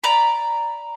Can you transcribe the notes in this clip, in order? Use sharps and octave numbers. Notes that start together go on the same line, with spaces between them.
D5 A#5 B5